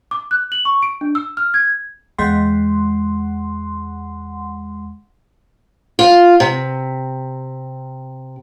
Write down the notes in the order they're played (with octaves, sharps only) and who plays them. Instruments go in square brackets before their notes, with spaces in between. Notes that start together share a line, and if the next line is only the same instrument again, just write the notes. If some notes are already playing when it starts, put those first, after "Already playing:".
[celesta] D6
F#6
F#7
C#6
D7
D4
E6
F6
G#6
[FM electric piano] E2 G#3 F#5 C6
[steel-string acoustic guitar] F4
C3